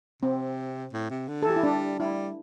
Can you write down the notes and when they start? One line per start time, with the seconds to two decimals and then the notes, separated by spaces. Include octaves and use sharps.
0.22 C3 C4
0.93 A2
1.10 C3
1.28 D3
1.42 A4
1.46 E3 G4
1.56 E4
1.63 G3 D4
1.99 G3 E4